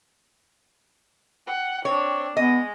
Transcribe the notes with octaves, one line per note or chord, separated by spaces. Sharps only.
F#5 G5
C4 D4 C#5
G#3 B3 D#5